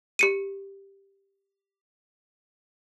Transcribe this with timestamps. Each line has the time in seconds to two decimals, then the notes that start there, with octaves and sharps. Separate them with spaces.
0.19 G4 C#7 D#7